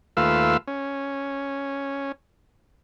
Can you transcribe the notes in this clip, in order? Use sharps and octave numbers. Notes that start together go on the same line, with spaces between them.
D#2 A3 F4 B4 F5 E6
C#4